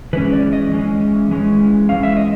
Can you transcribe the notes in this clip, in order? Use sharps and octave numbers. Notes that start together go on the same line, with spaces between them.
E3 G#3 C#4 B4
D5
D#5
E3 G#3 C#4
E3 G#3 C#4
E3 G#3 C#4 F5
E5
D#5